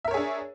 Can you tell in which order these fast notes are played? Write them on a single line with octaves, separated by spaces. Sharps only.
E5 A#4 C#5 G#4 D4